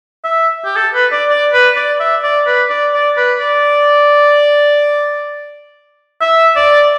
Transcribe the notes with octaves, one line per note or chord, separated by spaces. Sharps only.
E5
G4
A4
B4
D5
D5
B4
D5
E5
D5
B4
D5
D5
B4
D5
E5
D5